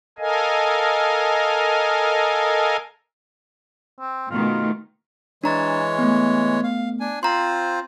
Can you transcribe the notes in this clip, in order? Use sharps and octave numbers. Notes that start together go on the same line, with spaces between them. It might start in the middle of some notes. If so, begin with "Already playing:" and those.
A4 A#4 D#5 F5 G#5
C4
B2 D#3 A3 F4
E3 G#3 D4 C#5 A#5 A6
A3 B3
F5
D4 G#5
C4 F4 C5 A#5 C6